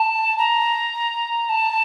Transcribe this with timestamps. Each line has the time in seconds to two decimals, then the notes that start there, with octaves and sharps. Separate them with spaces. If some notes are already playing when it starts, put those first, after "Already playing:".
Already playing: A5
0.38 A#5
1.49 A5